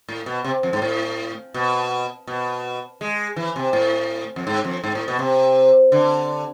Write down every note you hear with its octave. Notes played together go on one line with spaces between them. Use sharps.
A2
B2
C3
F2
G#2
A2
B2
B2
G#3
E3
C3
A2
F2
G#2
F2
G#2
A2
B2
C3
D3